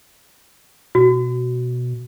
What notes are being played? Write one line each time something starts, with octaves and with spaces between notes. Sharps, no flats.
B2 F#4